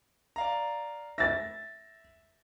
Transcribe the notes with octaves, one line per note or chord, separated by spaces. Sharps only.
D5 F5 A#5
E5 A6 A#6